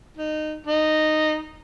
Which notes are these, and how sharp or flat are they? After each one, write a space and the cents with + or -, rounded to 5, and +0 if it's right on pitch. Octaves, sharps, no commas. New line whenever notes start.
D#4 -20
D#4 -10